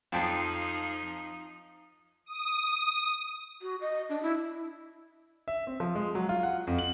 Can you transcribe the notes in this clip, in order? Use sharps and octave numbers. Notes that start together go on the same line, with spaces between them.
F2 F3 D#4 G5 A5
D#6
F#4
D#5
D4
E4
E5
C4
F3
G#3
F#3
F4
F#5
F2
F#7